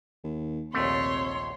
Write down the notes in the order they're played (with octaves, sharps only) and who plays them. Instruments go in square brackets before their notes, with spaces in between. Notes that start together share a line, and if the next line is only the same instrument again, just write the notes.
[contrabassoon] D#2
[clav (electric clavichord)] A#1 D#2 A3 [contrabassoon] C3 [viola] C#5 C6